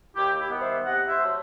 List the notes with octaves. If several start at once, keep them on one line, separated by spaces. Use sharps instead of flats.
D#2 E4 G4
E4 G4
D#3 G3 B3
C5 E5
C3 D#5 F#5
C5 E5
F#3 A3